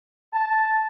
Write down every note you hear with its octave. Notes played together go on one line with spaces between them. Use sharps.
A5